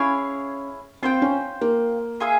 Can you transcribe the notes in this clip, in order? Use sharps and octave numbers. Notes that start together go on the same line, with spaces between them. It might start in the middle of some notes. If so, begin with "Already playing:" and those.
Already playing: C#4 E4 G#4 C#5 F5
C4 F4 C5 G5
C#4
A#3
F4 G#4 E5 G#5